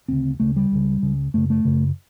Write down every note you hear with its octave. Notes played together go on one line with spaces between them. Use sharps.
D2 C#3 C4
D2 C#3 A3
G3
C#2 C#3
C#2 C#3
F#2 C#3 A3
A3
F#2 C#3